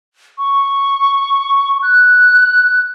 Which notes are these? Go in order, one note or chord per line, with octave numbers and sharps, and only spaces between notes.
C#6
F#6